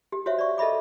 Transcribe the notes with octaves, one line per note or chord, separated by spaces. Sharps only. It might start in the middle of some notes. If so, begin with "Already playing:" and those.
G4
F#4 C5 C#5 E5 F5
D5 C#6
A4 D#5 E5 B5 D6